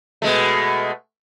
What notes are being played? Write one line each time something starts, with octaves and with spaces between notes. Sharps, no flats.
B2 G#3 A3